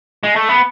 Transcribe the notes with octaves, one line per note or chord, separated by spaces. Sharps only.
G#3
A3
B3